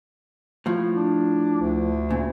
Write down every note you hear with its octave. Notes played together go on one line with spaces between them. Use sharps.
A2 F3
D4
D2
A#2 C#3